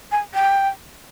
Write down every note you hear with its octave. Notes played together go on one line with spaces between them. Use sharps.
G#5
G5